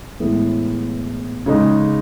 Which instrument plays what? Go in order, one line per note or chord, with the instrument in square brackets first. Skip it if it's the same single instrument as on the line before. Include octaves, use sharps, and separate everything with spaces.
[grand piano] A2 E3 G#3 B3
C#3 G#3 D#4